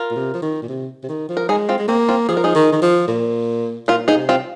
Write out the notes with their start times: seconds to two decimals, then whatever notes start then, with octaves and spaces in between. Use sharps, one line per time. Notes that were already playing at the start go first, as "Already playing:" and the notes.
Already playing: F4 A#4
0.12 A#2
0.16 C3
0.34 F3
0.42 D#3
0.63 A#2
0.69 C3
1.04 C3
1.09 D#3
1.29 F3
1.37 A#4
1.49 G#3 D#4 G#4
1.69 C4 F4
1.78 G#3
1.88 A#3 C4
2.09 C4 F4
2.29 F3 G#4
2.37 A#4
2.44 D#4 G#4
2.55 D#3
2.72 D#3
2.82 F3
3.08 A#2
3.88 A#2 F4 A#4
4.08 D#4 G#4
4.15 C3
4.29 C4 F4